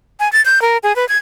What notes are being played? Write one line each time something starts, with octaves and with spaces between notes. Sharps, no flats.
G#5
A6
G6
A#4
G#4
B4
G#6